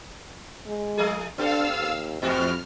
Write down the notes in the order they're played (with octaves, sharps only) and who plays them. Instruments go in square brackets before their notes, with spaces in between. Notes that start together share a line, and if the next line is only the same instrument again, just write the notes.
[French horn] G#3
[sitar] F3 A3 G#4
[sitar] B3 G4 A4 [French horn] D4 [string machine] F5 E6
[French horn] D#2
[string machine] F2 F6 [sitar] G#2 F#4 G4 [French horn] C4